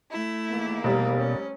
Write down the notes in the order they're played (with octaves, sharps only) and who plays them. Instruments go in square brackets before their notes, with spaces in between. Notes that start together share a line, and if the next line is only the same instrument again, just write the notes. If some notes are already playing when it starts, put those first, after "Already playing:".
[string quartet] A3 E4
[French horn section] E2 D#3 A#3
[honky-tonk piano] F1 G3 [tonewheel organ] B2
[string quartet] C#4